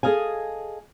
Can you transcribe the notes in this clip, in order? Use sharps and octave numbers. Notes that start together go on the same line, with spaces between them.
G#4 A4 D#5 F5 G#5